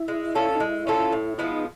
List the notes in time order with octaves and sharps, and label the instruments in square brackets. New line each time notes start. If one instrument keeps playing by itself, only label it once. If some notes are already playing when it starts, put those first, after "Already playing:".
Already playing: [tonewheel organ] E4
[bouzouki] G#3
C#4 F4 A4
[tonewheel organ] D#4
[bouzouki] G#3 [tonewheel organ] E4
[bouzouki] C#4 F4 A4
A2
[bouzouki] F3 G#3 B3 [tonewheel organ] E4
[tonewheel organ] D#4